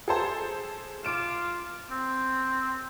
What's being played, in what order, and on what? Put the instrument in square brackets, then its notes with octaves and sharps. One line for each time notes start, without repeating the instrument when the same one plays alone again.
[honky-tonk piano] G#4 A4 C5
[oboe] F4 [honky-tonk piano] D6 D7 E7
[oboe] C4